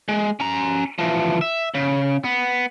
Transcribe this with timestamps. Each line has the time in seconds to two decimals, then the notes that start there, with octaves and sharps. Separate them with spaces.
0.09 G#3
0.40 C#4 A#5
0.99 E3 F3
1.41 E5
1.74 C#3
2.24 B3